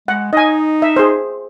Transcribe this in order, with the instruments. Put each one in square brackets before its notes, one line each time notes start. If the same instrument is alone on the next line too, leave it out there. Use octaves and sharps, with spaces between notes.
[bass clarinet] G#3 [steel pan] F#5
[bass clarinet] D#4 [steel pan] D#5 G#5
[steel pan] E5
G#4 C5